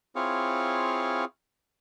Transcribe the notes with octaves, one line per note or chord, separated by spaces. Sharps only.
C4 E4 F4 G#4 C#5 F5